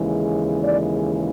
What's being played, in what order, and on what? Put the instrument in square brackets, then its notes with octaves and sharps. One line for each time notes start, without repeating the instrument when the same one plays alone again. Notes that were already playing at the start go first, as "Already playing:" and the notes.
Already playing: [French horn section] D#2 C#3 E3 G#3
D5